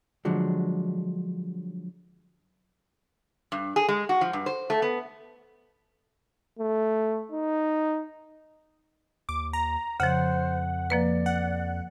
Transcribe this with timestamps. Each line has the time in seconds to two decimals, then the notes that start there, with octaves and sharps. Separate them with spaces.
0.25 D3 F3 F#3 G#3
3.52 G2
3.76 G#4
3.88 G#3
4.09 F#4
4.21 F3
4.33 G2
4.46 C5
4.70 A3
4.82 B3
6.59 A3
7.32 D#4
9.29 D#2 D6
9.53 A#5
10.00 F2 C#3 F3 C5 F#5
10.90 F3 A#3 B4 D5
11.26 F#5